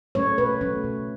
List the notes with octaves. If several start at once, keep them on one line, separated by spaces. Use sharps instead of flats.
F#3 A3 C#4 C#5
B2 B4
F#3 A3 C#4
B2